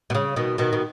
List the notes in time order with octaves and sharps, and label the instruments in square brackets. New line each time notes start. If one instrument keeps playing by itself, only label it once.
[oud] B2
C#3
B2 D#3
B2 D#3
B2